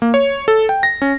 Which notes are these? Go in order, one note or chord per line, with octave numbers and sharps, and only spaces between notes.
A#3
C#5
A4
G5
A#6
C#4